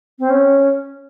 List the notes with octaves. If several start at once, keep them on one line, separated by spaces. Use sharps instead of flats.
C4
C#4